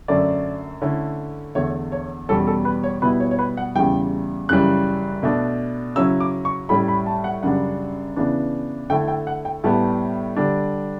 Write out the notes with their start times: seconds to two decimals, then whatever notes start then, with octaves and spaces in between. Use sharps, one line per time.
0.08 F#2 D3 A3 C#4 D5
0.82 D3 A3 C#4 E4
1.55 E2 D3 A3 C#5
1.92 C#5
2.29 E2 B2 G3 C#4 A4
2.47 A4
2.65 B4
2.83 C#5
3.02 B2 G3 B3 E4 B4
3.20 C#5
3.31 C#5
3.39 B4
3.57 F#5
3.75 E2 C#3 E3 G3 G5
4.49 F#2 C#3 E3 G3 C#4 F#6
5.23 B2 A3 D4
5.96 C#3 F#3 C#4 E4 E6
6.20 D6
6.45 C#6
6.69 A2 G3 C#4 E4 B5
6.88 B5
7.06 A5
7.24 F#5
7.43 F#2 C#3 G3 D4 F#5
8.16 C#3 E3 B3 D4
8.90 D3 A3 E4 G5
9.08 G5
9.27 F#5
9.45 G5
9.64 A2 G3 B3 A5
10.37 D3 G3 D4